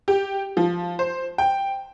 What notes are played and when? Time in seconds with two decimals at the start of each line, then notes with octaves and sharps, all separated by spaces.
0.08 G4
0.57 F3
0.99 C5
1.38 G5